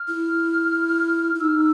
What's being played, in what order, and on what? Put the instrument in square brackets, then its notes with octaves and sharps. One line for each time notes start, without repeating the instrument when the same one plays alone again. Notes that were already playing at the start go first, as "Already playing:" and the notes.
Already playing: [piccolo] F6
[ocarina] E4
E4
[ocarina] D#4 [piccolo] E6
[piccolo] F6
E6